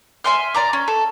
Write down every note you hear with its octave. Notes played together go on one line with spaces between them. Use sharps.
E5 G#5 C6 F6
D5 A#5 D6
C#4
A4